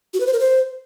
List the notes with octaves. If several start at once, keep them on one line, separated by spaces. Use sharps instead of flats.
F#4
B4
C5
A#4
C5